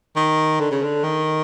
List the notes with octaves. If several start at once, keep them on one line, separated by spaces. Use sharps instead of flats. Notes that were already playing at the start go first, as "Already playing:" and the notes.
D#3
D3
C#3
D3
D#3